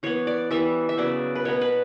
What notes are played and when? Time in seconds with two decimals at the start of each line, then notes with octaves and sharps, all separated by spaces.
0.03 E3 B3 C#5
0.27 D5
0.50 E3 G3 B3 E5
0.89 E5
0.97 C#3 F#3 B3 D5
1.35 B4
1.45 B2 F#3 B3 C#5
1.61 B4